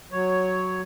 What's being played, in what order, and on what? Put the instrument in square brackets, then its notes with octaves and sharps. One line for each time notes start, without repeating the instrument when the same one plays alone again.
[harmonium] F#3 C#5